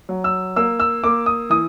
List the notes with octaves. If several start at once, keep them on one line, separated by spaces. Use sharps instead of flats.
F#3
E6
A#3 E6
E6
A#3 D6
D#6
E3 D#6